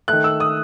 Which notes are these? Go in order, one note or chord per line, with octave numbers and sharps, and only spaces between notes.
D#3 A3 F#6
E6
D#6